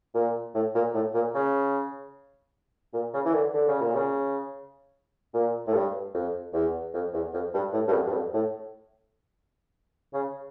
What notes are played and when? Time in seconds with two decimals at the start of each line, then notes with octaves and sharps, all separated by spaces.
0.14 A#2
0.55 A2
0.75 A#2
0.94 A2
1.14 A#2
1.34 C#3
2.93 A#2
3.14 C#3
3.25 E3
3.34 D3
3.54 D3
3.68 C#3
3.81 A#2
3.95 C#3
5.34 A#2
5.67 A2
5.74 G2
6.14 F2
6.53 E2
6.94 F2
7.13 E2
7.33 F2
7.54 G2
7.73 A2
7.88 G2
7.93 F2
8.06 G2
8.14 F2
8.34 A2
10.13 C#3